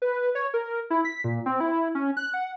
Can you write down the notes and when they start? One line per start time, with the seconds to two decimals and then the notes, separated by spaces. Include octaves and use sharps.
0.02 B4
0.35 C#5
0.54 A#4
0.90 E4
1.05 B6
1.24 A#2
1.46 C4
1.60 E4
1.95 C#4
2.17 F#6
2.34 F#5